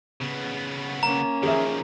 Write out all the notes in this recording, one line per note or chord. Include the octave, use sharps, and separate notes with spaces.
C#3 B3
A#3 C#4 A#5
D#3 F3 G#4 E5